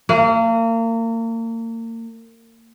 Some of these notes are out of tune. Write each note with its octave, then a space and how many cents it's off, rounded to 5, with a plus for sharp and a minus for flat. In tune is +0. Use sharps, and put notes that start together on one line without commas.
A#3 -35